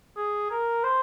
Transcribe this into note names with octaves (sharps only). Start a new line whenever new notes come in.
G#4
A#4
C5